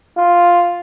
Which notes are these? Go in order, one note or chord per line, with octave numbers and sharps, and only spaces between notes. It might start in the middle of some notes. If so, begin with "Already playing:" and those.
F4